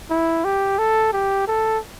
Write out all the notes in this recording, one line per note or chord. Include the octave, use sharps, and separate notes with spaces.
E4
G4
A4
G4
A4